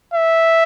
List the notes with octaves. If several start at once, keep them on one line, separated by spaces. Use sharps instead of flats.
E5